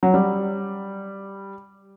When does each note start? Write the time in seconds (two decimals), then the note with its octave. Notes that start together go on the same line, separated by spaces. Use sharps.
0.03 F#3
0.14 G3